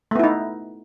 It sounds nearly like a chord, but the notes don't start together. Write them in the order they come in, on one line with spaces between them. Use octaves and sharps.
A3 B3 E4 D#4